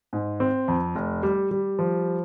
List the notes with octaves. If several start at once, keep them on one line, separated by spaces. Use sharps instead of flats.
G#2
C4
F2
F1
G3
G3
F3